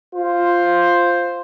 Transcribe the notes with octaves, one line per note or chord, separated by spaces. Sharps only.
F4 C5